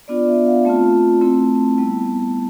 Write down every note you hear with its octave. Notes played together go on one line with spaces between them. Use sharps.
B3 D4 F4 D5
E5
F5
A3 C4 F4 A5
A3 C4 E4
G3 B3 E4